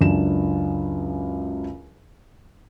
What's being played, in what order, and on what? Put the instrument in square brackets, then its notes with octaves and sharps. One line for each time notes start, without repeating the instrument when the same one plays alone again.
[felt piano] C#2 F#2 D4 E7